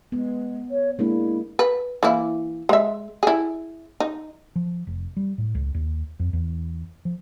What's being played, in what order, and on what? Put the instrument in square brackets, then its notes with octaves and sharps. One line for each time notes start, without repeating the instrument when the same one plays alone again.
[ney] G#3 [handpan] B3
[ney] C#5
[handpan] G#3 A#3 D4 [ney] E4
[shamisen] B4
E3 A#3 E4
G#3 E5
E4 G#4
D#4
[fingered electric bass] F3
F1
G3
A2
C#2
D#2
F2
E2
F3